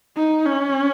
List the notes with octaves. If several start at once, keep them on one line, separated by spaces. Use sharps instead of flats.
D#4
C#4